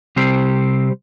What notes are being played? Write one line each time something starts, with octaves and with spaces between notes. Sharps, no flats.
C3 G3 C4 G4 C5